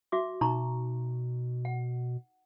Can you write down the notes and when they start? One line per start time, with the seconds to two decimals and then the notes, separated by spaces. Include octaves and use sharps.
0.12 F#4 E5 D6
0.41 B2 D#4 A#5 C#6
1.65 F#5